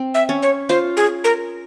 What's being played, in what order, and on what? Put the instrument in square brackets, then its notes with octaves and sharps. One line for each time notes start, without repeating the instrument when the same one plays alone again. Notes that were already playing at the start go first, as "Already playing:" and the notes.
Already playing: [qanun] C4
[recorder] E5
[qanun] C#4
[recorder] C#5
[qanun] F4 [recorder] C5
[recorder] G#4
A#4